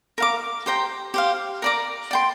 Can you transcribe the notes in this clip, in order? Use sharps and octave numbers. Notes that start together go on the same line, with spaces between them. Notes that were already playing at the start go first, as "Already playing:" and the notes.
A#4 F5 D6
G4 C5 G5 A#5
G4 C5 F5
A#4 D5 A#5 D6
D5 G5 C6